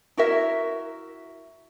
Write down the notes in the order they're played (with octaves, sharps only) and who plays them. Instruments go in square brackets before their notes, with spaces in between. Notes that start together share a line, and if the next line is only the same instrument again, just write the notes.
[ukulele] E4 F#4 A#4 E5